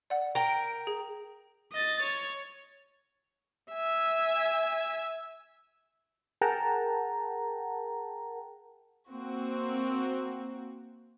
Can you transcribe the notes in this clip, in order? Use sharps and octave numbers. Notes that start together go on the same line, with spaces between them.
D5 F#5
A#4 G5
G#4
D#5 A6
C#5
E5 G#5
G#4 A#4 F#5 G5 A5 A#5
A#3 C4 F#4